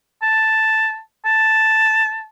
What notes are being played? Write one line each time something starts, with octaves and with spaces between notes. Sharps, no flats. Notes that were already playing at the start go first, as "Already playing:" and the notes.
A5
A5